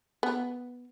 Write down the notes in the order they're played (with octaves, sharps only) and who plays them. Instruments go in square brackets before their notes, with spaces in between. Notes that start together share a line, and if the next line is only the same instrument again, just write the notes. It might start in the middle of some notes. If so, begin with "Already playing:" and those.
[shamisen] B3